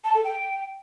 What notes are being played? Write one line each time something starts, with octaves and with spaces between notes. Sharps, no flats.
A5
A4
G5